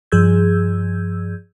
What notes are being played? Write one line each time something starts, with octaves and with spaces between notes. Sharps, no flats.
G2 F3 G#4 E6 G6 G#6